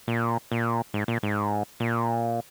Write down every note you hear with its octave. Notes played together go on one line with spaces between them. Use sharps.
A#2
A#2
G#2
A#2
G#2
A#2